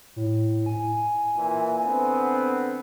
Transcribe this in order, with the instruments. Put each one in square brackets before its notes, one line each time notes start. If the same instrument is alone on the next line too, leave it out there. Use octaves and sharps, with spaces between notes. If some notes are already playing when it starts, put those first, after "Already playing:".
[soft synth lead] A2
G#5
[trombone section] A#2 E3
D3 B3 C4